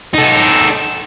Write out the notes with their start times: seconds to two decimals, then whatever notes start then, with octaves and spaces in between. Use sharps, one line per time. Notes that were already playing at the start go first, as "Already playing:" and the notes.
0.14 D#4 A4